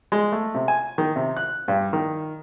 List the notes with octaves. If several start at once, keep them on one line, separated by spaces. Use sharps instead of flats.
G#3
A3
C3
G#5
D#3
C3
F#6
G2
D#3